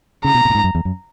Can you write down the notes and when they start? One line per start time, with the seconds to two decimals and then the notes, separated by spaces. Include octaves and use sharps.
0.24 C#3 A#5
0.35 B2
0.45 B2
0.50 A#2
0.55 G#2
0.64 F#2
0.75 E2
0.85 F#2